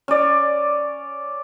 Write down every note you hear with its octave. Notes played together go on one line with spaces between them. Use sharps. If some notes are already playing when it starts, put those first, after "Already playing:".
C#4 D5